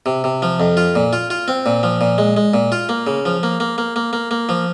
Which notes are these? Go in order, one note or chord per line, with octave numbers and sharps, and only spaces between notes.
C3
C3
F3
F2
F4
A#2
F4
F4
C4
A#2
F3
A#2
G#3
G#3
A#2
F4
A#3
C#3
F3
A#3
A#3
A#3
A#3
A#3
A#3
F3